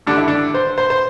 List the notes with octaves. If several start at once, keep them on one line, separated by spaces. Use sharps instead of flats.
G2 D3 D4
E4
D4
C5
C5
C5